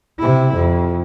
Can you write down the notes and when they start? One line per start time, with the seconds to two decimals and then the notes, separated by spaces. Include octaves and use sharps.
0.19 C3 E4
0.55 F2